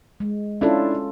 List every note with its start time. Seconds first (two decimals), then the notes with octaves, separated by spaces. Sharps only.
0.20 G#3
0.61 C#4 D4 E4 F4 A4